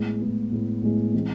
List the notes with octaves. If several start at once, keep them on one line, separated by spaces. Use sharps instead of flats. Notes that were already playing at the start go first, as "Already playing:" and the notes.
Already playing: A2 G#3 B3
A2 G#3 B3
A2 G#3 B3
A2 G#3 B3
E3 G#3 C4